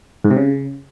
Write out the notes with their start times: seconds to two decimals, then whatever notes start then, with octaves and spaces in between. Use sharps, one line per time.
0.24 G#2
0.31 C3
0.37 C#3